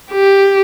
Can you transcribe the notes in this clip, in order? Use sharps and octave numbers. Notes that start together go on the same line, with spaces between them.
G4